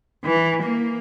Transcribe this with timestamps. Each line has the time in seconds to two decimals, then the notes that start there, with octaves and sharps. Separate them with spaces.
0.24 E3
0.63 A#3